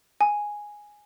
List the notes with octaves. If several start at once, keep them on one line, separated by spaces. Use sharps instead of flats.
G#5